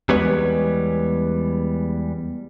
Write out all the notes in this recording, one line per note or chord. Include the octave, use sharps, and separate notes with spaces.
E2 G3 G#3 B3 B4 C#5